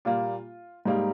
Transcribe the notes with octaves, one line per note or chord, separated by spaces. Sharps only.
A#2 G3 A#3 F4
G#2 G3 A#3 D#4